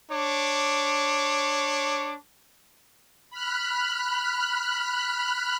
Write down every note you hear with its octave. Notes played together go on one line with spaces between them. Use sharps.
D4 C#5 D6
B5 F6 F#6